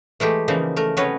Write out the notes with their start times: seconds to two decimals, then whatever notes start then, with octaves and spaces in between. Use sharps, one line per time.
0.20 E3 G#3 A3 G4
0.48 C#3 E3 F3 A#3 D#4
0.76 A3 A#4
0.97 C3 F#3 C#4 B4 C#5 D#5